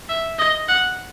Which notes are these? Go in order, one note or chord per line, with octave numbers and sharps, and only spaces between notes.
E5
D#5
F#5